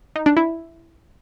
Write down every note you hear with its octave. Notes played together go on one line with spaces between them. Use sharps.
D#4
D4
E4